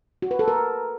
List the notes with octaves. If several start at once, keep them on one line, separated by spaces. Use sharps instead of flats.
F#4
B4
A4
A#4